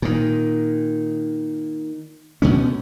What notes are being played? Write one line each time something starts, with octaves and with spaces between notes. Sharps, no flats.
A#2 D#3
D2 B2 G3 C#4